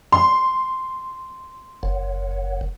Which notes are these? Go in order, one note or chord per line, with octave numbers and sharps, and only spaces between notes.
C6
F#1